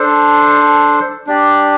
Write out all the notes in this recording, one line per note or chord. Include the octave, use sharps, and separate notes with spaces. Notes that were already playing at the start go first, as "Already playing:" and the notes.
Already playing: D4 A4 C5
D4 G4 D5